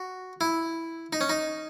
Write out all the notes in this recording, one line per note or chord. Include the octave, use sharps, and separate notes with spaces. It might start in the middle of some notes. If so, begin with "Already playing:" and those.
Already playing: F#4
E4
D#4
C#4
D#4